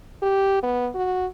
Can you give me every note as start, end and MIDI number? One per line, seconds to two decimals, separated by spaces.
0.22 0.59 67
0.63 0.89 59
0.94 1.26 66